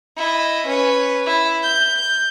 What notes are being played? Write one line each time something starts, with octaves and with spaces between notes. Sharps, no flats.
E4 D#5
C#4 B4
E4
G6
G6